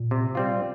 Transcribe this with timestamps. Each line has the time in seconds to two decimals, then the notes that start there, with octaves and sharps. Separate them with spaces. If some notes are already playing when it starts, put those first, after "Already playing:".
Already playing: A#2
0.11 C3
0.35 G3 C4 F4